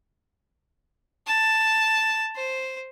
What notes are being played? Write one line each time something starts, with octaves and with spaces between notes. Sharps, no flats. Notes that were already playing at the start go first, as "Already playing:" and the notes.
A5
C5